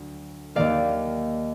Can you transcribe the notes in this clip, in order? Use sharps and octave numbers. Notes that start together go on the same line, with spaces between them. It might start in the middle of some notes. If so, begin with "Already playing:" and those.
Already playing: D2 D3 F#3
D#2 D#3 A#3 D5 F5